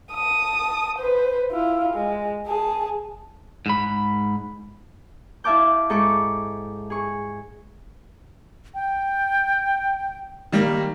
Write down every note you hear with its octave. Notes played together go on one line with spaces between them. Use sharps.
A5 D#6
B4 C5
E4 F4
G#3
G#4 A5
G#2 B5
E4 E5 F5 A5 D6 G6
G#2 A4 C#6 D6
G#4 C#6
G5
D#3 G3 A#3